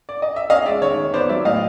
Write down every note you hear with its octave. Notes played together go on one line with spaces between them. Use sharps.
D5
D#5
E5
C#4 D#5 F5
G#3 D5 E5
D#3 C#5
D#3
B3 C5 D5
F#3 D5 E5
A2 D#5 F5